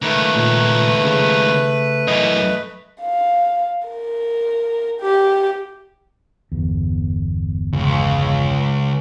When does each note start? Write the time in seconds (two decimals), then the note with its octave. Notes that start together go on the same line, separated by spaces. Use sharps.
0.02 C#2 D#3 A3 B4
0.36 A#2
1.04 C#3
2.08 F#2 E3 D#5
3.02 F5
3.88 A#4
5.00 G4
6.52 G1 E2
7.73 C#2